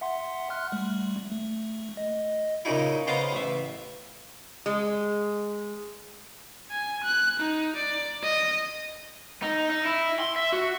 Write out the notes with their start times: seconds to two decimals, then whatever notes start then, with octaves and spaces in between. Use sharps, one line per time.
0.01 E5 F#5 C6
0.50 C6 F6 F#6
0.72 G3 A3
1.32 A3
1.97 D#5
2.65 A#2 C#3 D#4 E4
3.07 C#3 B3 C5 D#5 F5 A#5
3.33 A1 E5
4.66 G#3
6.71 G#5
7.04 F#6
7.40 D#4
7.76 D5
8.23 D#5
9.42 D#4
9.70 D#4
9.85 E4
10.20 C6
10.36 E5
10.52 F#4